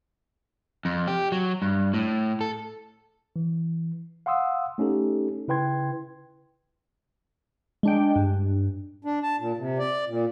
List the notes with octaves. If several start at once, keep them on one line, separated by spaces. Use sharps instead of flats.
F2
G4
F#3
G2
A2
A4
E3
F5 F#5 C6 D#6 E6
A3 C#4 D#4 G4 A4
C#3 E4 B4 G5 C6 G#6
G#3 D4 G5
G2
D4
A5
A#2
C3
D5
A#2